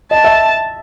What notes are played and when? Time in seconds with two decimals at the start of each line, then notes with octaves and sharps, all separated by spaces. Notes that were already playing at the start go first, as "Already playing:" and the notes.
0.11 D#5 A5
0.24 E5